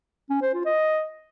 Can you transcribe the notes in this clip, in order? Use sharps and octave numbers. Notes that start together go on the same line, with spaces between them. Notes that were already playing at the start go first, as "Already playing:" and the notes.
C#4
C5
F4
D#5